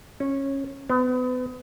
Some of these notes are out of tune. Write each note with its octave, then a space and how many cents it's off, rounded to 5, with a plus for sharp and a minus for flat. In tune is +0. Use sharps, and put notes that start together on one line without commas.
C#4 -15
B3 +35